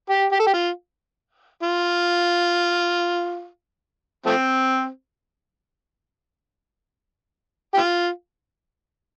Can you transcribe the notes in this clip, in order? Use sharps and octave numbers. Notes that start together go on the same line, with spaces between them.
G4
G4
A4
G4
F4
F4
F3 A3 C4
G4
F4